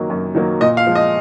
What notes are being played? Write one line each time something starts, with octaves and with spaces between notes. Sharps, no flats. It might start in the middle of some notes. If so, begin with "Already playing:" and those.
Already playing: F#2 D#3 F#3 A#3
F#2
D#3 F#3 A#3
A#2 D#5
F5
F3 G#3
D#5